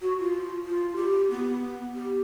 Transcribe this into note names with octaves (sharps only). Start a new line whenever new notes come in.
F#4
F4
F4
G4
B3
G4